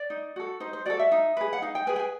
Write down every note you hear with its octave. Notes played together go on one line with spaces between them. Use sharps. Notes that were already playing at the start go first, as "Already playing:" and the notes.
Already playing: D5
D#4
F#4 A4
D#4 C5
C5
F#4 A4 D5
E5
D#4
G#4 B4
F#5
D#4 F5
G5
G#4 B4 G#5
G5
G#5